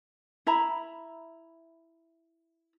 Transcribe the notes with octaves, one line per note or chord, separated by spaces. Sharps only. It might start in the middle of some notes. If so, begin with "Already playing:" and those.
E4 E5 A#5 B5